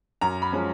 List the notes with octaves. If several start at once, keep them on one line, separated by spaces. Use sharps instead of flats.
F#2 A#5
B5
F3 G#3 C#4